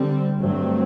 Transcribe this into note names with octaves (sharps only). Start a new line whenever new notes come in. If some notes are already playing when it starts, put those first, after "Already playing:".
Already playing: D3 G3 C4
G2 F#3 A3 C4